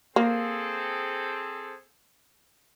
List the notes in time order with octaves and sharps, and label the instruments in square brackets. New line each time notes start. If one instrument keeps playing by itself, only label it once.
[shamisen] A#3 [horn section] C4 G#4 A4